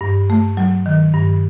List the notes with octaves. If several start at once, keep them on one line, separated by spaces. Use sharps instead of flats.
G2
A3
F#3
D#3
G2